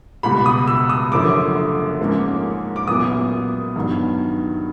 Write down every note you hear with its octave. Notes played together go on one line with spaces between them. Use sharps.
C#2 B2 G3 B5
D#6
E6
D#6
F#1 F#2 D3 F3 A3 D6
G#2 F3 A#3 C#4
D6
C2 A#2 F#3 B3 D#6
G2 D#3 F#3 B3